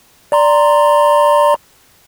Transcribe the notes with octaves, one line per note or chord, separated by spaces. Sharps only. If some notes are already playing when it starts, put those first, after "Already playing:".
D5 A#5 C6